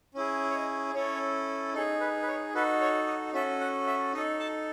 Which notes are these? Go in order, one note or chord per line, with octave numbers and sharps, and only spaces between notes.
C#4 E4 G#4
C#5
D#5
C#4 E4 A4 C#5
D#4 G#4 A4
B4
B4
C#5
D#4 F#4 A4 B4
C#5
D#5
C#4 F#4 A4 E5
F#5
E5
D#4 A4 D#5
A5